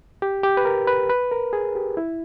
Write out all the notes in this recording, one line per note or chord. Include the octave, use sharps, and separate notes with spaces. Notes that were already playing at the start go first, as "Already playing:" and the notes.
G4
G4
B4
A#4
B4
B4
A#4
G#4
G4
E4